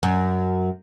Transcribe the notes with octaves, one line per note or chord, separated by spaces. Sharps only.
F#2